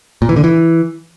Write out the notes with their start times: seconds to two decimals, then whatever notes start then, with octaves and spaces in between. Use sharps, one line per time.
0.22 A#2
0.29 E3
0.36 D3
0.44 E3